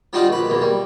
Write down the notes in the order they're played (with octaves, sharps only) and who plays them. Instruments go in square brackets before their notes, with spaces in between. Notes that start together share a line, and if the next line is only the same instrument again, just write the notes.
[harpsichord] F3 G3 D4 D#4 F4 F#4
A#1 B4
B1 E2 A#2
G3